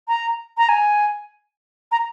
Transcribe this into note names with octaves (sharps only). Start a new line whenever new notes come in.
A#5
A#5
G#5
A#5